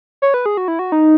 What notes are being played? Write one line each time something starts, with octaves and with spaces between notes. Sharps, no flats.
C#5
B4
G#4
F#4
E4
F#4
D#4